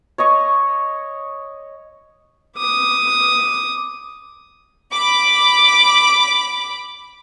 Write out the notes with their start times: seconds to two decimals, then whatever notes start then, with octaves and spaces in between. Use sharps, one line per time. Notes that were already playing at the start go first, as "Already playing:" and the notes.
0.18 C#5 D#5 C#6
2.57 D6 D#6
4.91 B5 D6